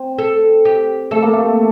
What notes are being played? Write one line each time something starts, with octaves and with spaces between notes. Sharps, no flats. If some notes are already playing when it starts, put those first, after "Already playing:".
Already playing: C4
A4
G4
A3 A4
A#3
A3